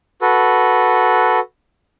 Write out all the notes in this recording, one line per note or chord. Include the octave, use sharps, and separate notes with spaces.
F#4 A4 B4